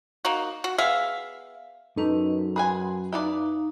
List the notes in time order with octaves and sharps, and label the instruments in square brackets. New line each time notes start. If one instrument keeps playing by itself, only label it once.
[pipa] A#3 D#4 F#4
F#4
B3 G#4 E5 F5
[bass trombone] F#2 [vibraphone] C#4 B4 D#5 [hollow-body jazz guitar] D#4 A4
[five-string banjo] G#4 B4 G#5 [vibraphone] F#5 A5 C6 [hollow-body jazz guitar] B5
[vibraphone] D#4 F5 A#5 [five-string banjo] E4 B4 D5